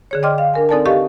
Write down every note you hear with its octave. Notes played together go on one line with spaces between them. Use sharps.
D3 G#4 C#5
D5 D#5 G5 C6 D6 F6
F5
D4 A#4 G#5
C4 D#4 A4 D5 G#5 A5
G4 A4 D#5 F5 C#6